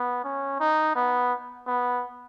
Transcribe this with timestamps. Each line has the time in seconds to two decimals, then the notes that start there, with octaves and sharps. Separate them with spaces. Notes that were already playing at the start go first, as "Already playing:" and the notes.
Already playing: B3
0.24 C#4
0.60 D#4
0.96 B3
1.67 B3